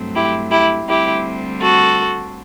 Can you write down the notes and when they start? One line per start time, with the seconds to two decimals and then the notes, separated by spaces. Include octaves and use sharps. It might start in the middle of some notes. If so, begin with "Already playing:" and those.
Already playing: G2 F#3 A3 C4
0.15 E4 G4
0.51 E4 G4
0.88 D2 D3 G3 C4 E4 G4
1.60 F#4 A4